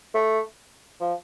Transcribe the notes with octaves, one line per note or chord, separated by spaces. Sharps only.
A3
F3